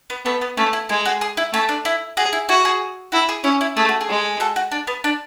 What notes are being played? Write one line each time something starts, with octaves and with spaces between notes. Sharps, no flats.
B3
A3 B3
B3
A3 C#4
E4
G#3 E4
F#4
G#4
E4
A3 C#4
D4
E4
F#4 G#4
E4
E4 F#4
G#4
E4 F#4 A4
G#4
C#4 E4
E4
A3 G#4
F#4
G#4
G#3
F#4 A4
F#4
D4
B3
D4